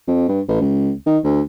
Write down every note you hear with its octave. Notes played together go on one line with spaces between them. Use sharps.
F2
G2
A1
C#2
D#3
D2